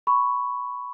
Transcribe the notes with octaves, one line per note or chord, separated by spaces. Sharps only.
B5 C#6